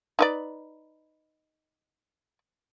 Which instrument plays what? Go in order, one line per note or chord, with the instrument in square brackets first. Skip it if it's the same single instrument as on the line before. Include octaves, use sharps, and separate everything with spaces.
[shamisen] D#4 B4 D5